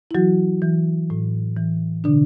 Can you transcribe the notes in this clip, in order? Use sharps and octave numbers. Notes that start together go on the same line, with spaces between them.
E4
E3 F#3 F#4
E3
A2
E3
B2 D3 D4